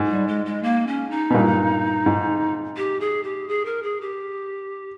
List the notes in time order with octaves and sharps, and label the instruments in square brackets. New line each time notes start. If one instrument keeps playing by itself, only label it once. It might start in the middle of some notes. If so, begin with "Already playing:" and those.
Already playing: [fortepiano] G#2
[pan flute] G3
G#3
G#3
A#3
C#4
D#4
[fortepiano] B2
G2 A#2
G#2
[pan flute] G4
G#4
G4
G#4
A#4
G#4
G4